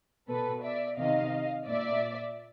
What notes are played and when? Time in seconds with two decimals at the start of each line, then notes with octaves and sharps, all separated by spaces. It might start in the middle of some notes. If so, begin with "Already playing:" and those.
0.28 B2 A4 B4
0.63 D5 E5
0.97 C3 D#3 D#5 F5
1.67 A#2 D5 E5